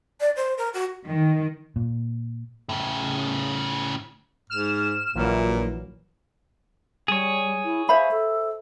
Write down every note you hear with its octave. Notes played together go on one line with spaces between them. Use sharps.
D5
C5
A#4
F#4
D#3
A#2
A2 C#3
G#2 F6 E7
A#1 A#2 E3 F#3
G3 G#4 C#5
E4
C5 E5 F5 B5
A4